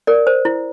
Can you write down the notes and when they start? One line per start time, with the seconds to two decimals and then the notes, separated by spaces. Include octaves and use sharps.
0.07 A#4 D5
0.27 C5
0.45 E4